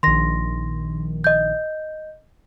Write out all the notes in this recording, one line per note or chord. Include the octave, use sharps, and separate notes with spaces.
A#1 D#3 C6 A#6
D#5 G6